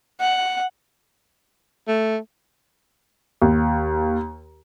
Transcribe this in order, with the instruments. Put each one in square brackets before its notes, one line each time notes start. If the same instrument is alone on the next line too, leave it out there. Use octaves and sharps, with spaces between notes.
[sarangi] F#5
[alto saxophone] A3
[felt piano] D#2